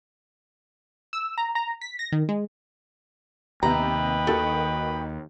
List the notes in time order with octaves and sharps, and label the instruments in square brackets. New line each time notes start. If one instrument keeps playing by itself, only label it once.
[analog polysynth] E6
A#5
A#5
B6
A#6
D#3
G#3
[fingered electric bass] D#2 [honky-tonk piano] C3 B3 G4 [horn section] B4 D#5 G5 [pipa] A#5
[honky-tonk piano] D#3 F#4 [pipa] A4